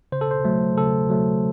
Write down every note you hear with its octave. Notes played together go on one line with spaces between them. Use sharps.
C#3 C5
A4
C5
F#3 A3
C#3 A4
F#3 A3